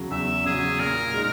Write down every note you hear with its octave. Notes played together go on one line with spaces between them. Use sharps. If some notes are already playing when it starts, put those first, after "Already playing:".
Already playing: E2 C#3 F#3
E2 E5
C#3 F#3 G#4
A#2 A#4
G#3 D#4